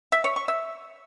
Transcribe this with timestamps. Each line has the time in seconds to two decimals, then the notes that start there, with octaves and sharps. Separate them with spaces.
0.12 E5
0.24 C#5
0.36 C#6
0.48 E5